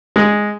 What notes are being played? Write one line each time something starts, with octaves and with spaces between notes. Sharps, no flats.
G#3